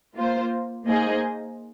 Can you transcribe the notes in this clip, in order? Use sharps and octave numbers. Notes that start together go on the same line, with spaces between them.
A#3 F4 C5
A#3 D#4 G#4 C5 D#5